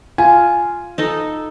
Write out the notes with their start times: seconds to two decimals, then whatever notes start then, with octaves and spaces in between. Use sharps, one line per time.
0.18 F4 G#5
0.98 D#4 A4 D#5